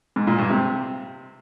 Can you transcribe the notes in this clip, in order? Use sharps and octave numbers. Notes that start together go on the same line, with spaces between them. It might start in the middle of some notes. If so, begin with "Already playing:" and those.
G#2
A#2
G2
C3